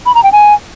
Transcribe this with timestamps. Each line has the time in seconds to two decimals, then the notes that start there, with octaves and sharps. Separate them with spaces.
0.06 B5
0.15 A#5
0.24 G5
0.32 G#5